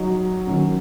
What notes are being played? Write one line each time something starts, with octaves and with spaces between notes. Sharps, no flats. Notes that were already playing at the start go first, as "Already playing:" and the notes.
Already playing: F#3 D#4 F#4
D#3 F#3 C#4